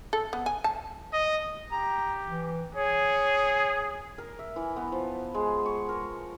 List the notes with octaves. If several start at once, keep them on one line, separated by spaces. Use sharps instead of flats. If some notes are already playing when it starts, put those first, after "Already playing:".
A4
B3
G#5
A5
D#5
G4 A#5
E3
G#4 C#5
A#4
E5
E3
B3
F3
G#3
C#6
A#4